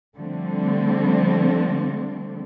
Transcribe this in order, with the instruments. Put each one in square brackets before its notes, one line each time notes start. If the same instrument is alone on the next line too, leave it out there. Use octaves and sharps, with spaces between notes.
[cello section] D3 F3 G3 A3 C4